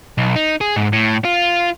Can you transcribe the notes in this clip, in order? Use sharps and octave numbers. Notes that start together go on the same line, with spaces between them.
B1
D#4
G#4
G#2
A2
F4